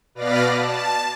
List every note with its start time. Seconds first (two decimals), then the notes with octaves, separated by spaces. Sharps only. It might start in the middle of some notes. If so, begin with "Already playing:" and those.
0.15 B2 B4 D5 F5 A#6
0.54 A5